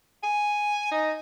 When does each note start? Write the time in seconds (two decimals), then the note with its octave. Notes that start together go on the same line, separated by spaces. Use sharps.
0.23 G#5
0.91 D#4